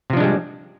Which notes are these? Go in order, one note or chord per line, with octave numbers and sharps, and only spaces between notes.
C3 F3 G3 G#3 D4